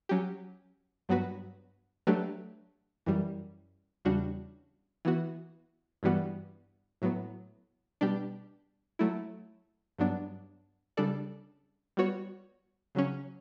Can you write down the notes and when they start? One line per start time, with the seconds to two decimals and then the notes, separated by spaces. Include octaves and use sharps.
0.09 F#3 C#4 G4
1.09 G2 F#3 B3 F#4 B4
2.07 F#3 A3 D4 G4 B4
3.06 F#2 E3 G3
4.05 E2 C#3 G3 D4 F#4
5.05 E3 B3 F#4
6.03 G2 E3 G3 B3 F#4
7.02 A2 F#3 B3
8.01 B2 G3 D4 G4
8.99 F#3 A3 E4
9.98 G2 F#3 B3 D4
10.97 C#3 G3 D4 A4 D5
11.97 G3 B3 F#4 C#5
12.95 C#3 F#3 C#4